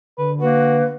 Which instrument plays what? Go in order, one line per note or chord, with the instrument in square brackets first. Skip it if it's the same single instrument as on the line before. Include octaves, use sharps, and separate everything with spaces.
[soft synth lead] D3 [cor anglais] B4
[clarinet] A#3 [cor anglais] F#4 [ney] B4